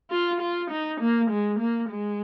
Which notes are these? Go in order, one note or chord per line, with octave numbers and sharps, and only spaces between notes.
F4
F4
D#4
A#3
G#3
A#3
G#3